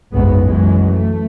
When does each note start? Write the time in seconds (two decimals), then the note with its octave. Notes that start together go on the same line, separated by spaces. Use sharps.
0.14 F#1 B1 G#2 C#3 G#3 B3
0.44 F#2 E3 F#3 G#3
0.93 A3